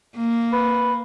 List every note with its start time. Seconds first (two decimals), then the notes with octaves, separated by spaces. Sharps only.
0.16 A#3
0.53 B4